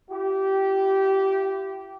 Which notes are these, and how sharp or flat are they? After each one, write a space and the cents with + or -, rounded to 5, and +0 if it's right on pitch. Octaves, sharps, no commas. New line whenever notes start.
E4 +45 G4 -20